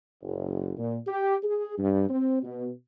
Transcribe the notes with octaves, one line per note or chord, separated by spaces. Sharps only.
F#1
A#2
G4
G#4
G2
C4
B2